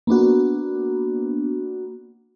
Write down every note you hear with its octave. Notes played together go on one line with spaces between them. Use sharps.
A#3 B3 D4 F#4